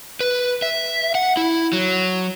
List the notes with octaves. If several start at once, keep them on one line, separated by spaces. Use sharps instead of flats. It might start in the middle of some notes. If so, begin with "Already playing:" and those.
B4
E5
F#5
E4
F#3